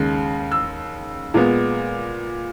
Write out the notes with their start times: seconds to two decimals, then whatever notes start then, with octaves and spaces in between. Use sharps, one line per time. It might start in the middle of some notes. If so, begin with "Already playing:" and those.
Already playing: D#2 C#3 G#3
0.52 E6
1.34 A#2 G#3 B3